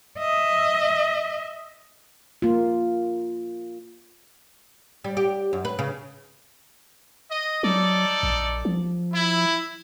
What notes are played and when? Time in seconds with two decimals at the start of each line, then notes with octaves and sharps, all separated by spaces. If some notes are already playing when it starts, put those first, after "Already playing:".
0.18 D#5 E5
2.42 A#3 F4
5.04 G3
5.17 G4
5.53 F#2
5.65 B4
5.79 C#3
7.29 D#5
7.63 F#3 D#4 A4 D5
8.23 A#1
8.65 F3
9.13 E4